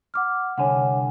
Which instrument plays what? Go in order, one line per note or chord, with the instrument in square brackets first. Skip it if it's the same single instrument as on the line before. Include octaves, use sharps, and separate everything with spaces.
[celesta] F#5 D6 F6
[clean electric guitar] C2 D3 G#5 [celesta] C#5 F#5